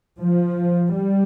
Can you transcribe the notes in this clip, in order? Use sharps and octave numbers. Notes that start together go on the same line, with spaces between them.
F3
G3